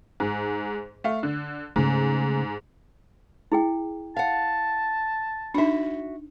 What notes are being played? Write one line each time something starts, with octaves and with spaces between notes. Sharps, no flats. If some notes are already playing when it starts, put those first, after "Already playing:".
G#2
A3 F5
D3
G#2 C#3 A3
E4 G#4 G5
F5 F#5 A5
D4 D#4 F#4 E5